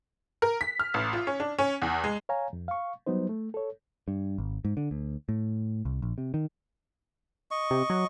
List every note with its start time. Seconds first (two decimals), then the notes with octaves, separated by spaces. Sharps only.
0.42 A#4
0.61 B6
0.80 F6
0.94 A1
1.13 F4
1.27 C#4
1.40 D4
1.59 C#4
1.82 E2
2.04 G#3
2.29 C#5 F5 G#5 A#5
2.53 F2
2.68 F5 C#6
3.07 F#3 G3 B3 D#4 C5
3.29 A3
3.54 A4 C#5
4.08 G2
4.38 G#1
4.65 G#2
4.77 D3
4.91 D2
5.29 A2
5.85 C2
6.02 A#1
6.18 C3
6.34 D#3
7.51 D#5 C#6
7.71 C3
7.90 F#3